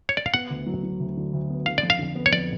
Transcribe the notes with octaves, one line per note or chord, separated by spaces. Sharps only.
C#5
D5
F5
B3 F#5
D2
F#3
F#3
D2
D3
D2
B3
D3 F5
D5
F2
F5
D3
B3
C#5
F2 D5